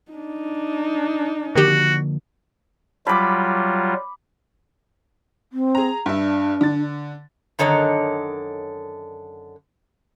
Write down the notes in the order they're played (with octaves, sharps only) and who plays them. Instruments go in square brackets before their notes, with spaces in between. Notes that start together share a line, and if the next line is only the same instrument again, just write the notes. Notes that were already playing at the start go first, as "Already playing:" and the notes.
[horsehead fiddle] D4 D#4
[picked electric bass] D3 F3 A#3 [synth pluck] D#3 G4 [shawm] F#4
[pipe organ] F#3 G3 F4 [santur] B5 D6
[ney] C4
[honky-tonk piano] G#4 A#5
[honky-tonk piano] G2 E5 [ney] D4
[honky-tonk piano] D3 A6
[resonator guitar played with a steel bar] F#2 D3 D#3 C#5 D#5